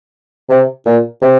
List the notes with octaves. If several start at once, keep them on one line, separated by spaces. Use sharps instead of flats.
C3
A#2
C3